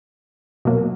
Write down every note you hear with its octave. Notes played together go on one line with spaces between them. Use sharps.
B2 F#3 A#3